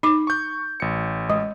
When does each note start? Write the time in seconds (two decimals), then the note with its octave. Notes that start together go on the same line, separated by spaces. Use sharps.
0.03 D#4 D6
0.27 C#6 G6
0.80 A1 C#7
1.30 G#3